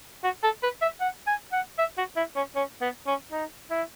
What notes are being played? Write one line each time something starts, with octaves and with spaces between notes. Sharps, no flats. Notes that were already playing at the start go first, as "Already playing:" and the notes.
F#4
A4
B4
E5
F#5
G#5
F#5
E5
F#4
E4
C#4
C#4
B3
C#4
D#4
E4